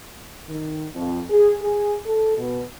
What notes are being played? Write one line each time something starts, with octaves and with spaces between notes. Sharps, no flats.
D#3
F2
G#4
G#4
A4
B2